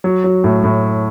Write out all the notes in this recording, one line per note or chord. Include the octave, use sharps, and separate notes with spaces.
F#3
F#3
A2
A2